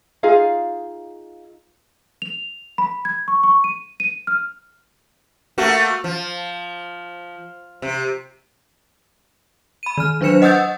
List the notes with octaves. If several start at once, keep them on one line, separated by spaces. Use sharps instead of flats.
D#4 F4 G#4 F5
F7
B5
G#6
C#6
C#6
D#7
D#7
F6
A3 A#3 F#4
F3
C3
B5 D#7
D#3 F6
F#3 D4 B4 C5 C#7 E7
D#5 F#5 D#6 E6 G6 A6